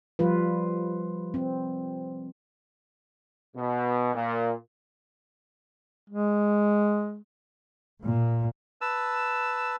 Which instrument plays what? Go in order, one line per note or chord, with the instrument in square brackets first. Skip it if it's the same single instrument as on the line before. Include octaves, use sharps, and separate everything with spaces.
[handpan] F3 G3 F4 B4
C4
[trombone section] B2
A#2
[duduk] G#3
[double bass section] A#2
[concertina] B4 A5 E6